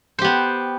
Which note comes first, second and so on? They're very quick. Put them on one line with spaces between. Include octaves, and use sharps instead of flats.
C5 G4 B3